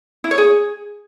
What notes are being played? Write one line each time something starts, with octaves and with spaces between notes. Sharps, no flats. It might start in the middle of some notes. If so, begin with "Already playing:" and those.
E4
C#5
G#4